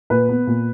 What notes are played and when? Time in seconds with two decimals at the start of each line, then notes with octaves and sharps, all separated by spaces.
0.10 A#2 B4
0.29 B3
0.47 A#2